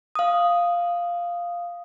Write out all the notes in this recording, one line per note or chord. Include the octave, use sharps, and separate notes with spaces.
F5 D#6